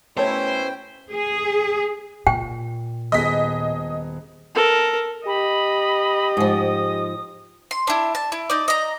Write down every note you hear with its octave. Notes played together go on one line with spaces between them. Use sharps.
B2 A3 C#4 E4 C5 C#5 G5
G#4
A#2 G5
D#1 B3 G#4 D#5 B6
A4 A#4
G4 D#5 B5
G#2 F3 D#6
C6
D4 E4
A5
E4
D#4 D5
D#5 A#5